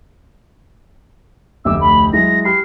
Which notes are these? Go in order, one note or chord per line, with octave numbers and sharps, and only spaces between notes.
F1 D2 D6 E6
B5
F#3 G#3 E4 A#6
G4 B5 F6 C7